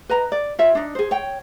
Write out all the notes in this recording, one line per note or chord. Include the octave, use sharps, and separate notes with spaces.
B4 D#5 A#5
D5
F4 C#5 E5
D4 D#4
G#4 C5
C#5 G5